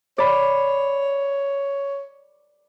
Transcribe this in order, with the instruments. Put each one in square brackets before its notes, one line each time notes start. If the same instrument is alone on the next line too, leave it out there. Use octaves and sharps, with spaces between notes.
[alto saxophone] C#5 [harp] D5 B5